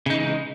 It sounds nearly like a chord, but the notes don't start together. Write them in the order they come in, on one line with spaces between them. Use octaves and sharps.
C#3 D#4 E3 G#3